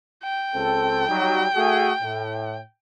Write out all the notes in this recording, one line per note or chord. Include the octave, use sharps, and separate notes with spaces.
G5
C#2 C4 A4
F#3 G3 D#4
A3 F#4 G#4
A2